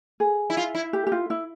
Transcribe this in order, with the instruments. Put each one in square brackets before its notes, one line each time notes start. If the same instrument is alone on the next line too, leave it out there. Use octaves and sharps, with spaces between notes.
[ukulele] G#4
[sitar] E4
F4
E4
[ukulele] G4
G4
F4
E4